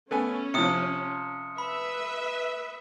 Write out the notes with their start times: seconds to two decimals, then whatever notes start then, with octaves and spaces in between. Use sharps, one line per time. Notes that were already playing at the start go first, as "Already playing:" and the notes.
0.11 A3 B3 C#4 G#5
0.54 C3 F3 D#6 C#7
1.58 B4 E5 B5